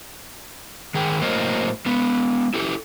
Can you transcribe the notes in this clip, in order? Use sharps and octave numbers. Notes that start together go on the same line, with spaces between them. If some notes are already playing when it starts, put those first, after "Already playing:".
D#3 G#4 G5
A2 F#3 A#3 A#4 C5 D#5
G#3 B3
E4 G4 A4